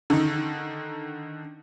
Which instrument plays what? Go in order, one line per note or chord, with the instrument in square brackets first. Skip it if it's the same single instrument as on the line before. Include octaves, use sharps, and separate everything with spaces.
[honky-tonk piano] D3 D#3 D#4